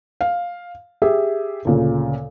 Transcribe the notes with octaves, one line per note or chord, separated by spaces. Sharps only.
F5
G4 G#4 E5
D2 A#2 C#3